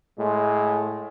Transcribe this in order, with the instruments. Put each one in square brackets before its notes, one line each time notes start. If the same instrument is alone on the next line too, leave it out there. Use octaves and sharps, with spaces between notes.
[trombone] A2 [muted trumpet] G#3